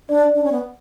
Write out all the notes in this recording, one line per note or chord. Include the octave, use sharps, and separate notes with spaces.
D4 D5
D4
C#4
B3